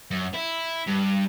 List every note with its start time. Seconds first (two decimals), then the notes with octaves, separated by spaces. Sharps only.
0.11 F#2
0.34 E4
0.87 G2